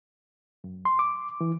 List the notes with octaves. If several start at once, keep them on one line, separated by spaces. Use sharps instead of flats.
F#2
C6
D6
E3